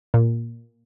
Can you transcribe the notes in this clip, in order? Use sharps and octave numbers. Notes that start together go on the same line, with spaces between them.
A#2